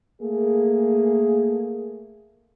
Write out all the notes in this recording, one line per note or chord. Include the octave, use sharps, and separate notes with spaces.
A3 A#3 G#4